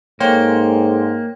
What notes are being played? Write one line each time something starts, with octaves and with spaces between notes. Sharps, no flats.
G#2 A#3 A4 C#5 G5 G#5 C6